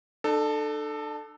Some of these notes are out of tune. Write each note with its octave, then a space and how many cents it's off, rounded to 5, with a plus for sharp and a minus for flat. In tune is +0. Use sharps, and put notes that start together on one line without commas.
D4 +45 A4 +0